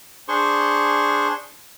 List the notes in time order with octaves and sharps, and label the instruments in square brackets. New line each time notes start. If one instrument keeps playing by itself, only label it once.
[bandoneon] D4 G#4 C5 C6 C#6